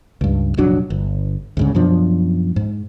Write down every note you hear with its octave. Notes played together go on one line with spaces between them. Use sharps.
C#2 G2
F1 A#1 F#3 D4
G1
D2 G#2 C#3
F#2 B2 F3 D4
G#2